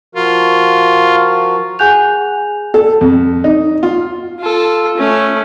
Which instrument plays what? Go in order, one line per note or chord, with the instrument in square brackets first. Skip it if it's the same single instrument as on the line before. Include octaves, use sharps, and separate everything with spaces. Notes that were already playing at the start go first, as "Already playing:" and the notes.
[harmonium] F3 F#4 A#4 [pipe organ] F4
[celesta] G#4 F#5 G#5 F#6 G6 F7
[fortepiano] A4
F2
D#4
F4
[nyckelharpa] F4 A4
A3 C#4